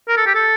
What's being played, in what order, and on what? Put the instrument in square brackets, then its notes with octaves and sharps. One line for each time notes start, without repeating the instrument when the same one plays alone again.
[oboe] A#4
A4
G4
A4